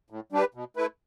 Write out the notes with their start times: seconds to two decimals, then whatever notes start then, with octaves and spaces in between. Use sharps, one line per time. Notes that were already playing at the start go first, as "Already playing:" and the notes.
0.10 A2
0.32 G3 D4 G4 B4
0.54 B2
0.76 A3 E4 B4